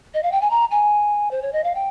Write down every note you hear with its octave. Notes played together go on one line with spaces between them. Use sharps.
D#5
F5
G5
G#5
A#5
G#5
C5
C#5
D#5
F5
G5